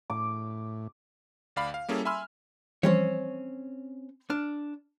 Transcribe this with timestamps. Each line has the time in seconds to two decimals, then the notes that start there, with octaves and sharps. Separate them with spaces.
0.10 A2 D6
1.56 D2 D5 F5 B5
1.74 F5
1.88 G3 A#3 C#4 E4 G#4 A4
2.05 E5 G#5 B5 C6 E6 F6
2.83 E3 F3 G3 C4 C#4 C#5
4.30 D4 F6